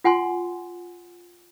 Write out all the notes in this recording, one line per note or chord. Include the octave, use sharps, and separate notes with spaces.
F4 F#5 G#5 C6